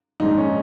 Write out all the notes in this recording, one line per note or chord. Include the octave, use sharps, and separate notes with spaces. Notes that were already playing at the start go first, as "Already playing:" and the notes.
A#1 G#2 D#3 D#4
C#4